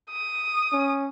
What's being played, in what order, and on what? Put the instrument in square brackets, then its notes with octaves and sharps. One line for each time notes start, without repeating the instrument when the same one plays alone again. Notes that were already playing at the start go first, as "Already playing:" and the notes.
[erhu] D#6
[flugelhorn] C#4